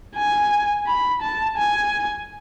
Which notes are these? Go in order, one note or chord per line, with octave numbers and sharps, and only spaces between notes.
G#5
B5
A5
G#5